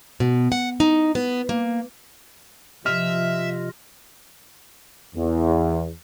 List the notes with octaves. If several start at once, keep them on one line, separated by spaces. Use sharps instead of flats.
B2
F#5
D#4
B3
A#3
C3 F3 F4 D#5 E5 F6
E2